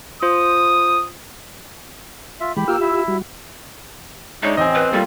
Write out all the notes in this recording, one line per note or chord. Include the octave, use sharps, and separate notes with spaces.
F4 C5 D#6
F4 E5
E3 G#3 G4 B5
A#3 F4 G4 G5 E6 F6
E4 E5
G3 F#4
G#3 D4 D#4 C#5 E5
A1 C4 D#5 G#5
B4
G3 A3 A#3 F4 G4